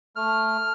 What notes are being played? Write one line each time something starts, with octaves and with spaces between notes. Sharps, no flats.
A3 F6